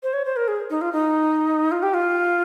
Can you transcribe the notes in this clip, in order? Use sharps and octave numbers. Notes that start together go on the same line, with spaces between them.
C5
C#5
C5
A#4
G#4
D#4
F4
D#4
F4
G4
F4